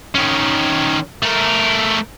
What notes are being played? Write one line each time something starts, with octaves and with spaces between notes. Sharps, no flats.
D#3 C#4
A3 A#4